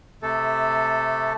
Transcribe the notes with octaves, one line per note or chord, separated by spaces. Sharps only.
C3 A3 A4